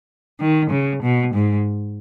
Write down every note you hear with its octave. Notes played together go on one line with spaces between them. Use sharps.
D#3
C#3
B2
G#2